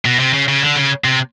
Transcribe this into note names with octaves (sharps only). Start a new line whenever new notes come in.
B2
C3
C#3
C#3
D3
C#3
C3